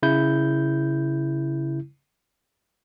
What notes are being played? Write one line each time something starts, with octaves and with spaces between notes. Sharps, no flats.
C#3 E4 G6